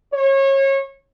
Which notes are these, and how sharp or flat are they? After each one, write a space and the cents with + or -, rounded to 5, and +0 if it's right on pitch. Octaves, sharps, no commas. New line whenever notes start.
C#5 -30